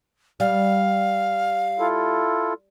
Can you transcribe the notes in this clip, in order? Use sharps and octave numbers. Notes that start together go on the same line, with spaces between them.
G3 F5
E4 F4 A4